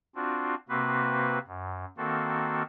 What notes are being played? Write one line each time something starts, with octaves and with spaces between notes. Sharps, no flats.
C4 D4 F4 F#4
C3 A#3 C4 F#4 B4
F#2
D#3 A#3 C4 F#4 A4